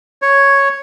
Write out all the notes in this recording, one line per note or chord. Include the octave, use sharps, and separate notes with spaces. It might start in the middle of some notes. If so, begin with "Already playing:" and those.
C#5